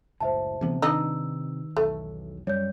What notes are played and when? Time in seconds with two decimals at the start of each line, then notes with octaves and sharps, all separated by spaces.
0.20 F#1 C#2 A2 C5 E5 A5
0.61 D2 C3 E3 B3
0.82 D#3 D4 D#4 B4 D#5 E6
1.77 E1 B1 A3
2.47 F#2 G3 C#5 D5 G6